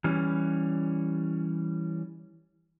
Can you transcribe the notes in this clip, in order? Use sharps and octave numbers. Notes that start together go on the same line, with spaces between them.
E3 G3 C#4